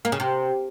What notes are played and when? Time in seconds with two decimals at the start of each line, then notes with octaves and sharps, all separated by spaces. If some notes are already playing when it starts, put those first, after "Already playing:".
0.05 A#3
0.12 C#3
0.20 C3